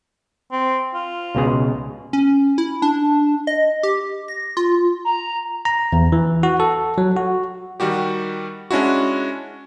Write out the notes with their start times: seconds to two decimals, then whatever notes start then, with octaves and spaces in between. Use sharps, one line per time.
0.52 C4
0.94 F4
1.35 C#2 B2 G#4
2.13 C#4
2.58 E4
2.82 D4
3.47 D#5
3.83 G4
4.28 A#6
4.57 F4
5.05 A#5
5.65 A#5
5.93 E2
6.12 E3
6.43 F#4
6.60 A4
6.98 F#3
7.17 F#4
7.80 D#3 G3 F#4 G4
8.71 G#3 C#4 D4 E4 F#4